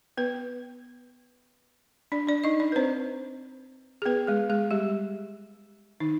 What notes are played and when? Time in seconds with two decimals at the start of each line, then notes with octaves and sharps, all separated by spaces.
0.18 B3 B4
2.12 D4 D5
2.27 D4 D5
2.44 D#4 D#5
2.60 D4 D5
2.72 B4
2.76 C4 C5
4.02 G#4
4.06 B3 B4
4.28 G#3 G#4
4.50 G#3 G#4
4.71 G3 G4
6.00 D#3 D#4